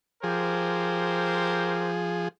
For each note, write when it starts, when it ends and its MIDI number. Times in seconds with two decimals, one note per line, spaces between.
0.23 2.28 53
0.23 1.91 67
0.23 2.28 68
0.23 1.91 70
0.23 1.91 72